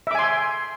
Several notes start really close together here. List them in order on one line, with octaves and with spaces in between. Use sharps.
E5 D6 G#5 C6